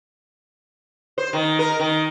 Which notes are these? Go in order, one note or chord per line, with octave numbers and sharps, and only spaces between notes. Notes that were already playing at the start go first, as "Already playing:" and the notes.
C5
D#3
A#4
D#3